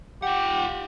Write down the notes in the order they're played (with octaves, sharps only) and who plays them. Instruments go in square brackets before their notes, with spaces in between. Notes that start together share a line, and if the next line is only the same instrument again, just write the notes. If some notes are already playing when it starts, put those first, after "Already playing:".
[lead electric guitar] F4 F#5 [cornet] G4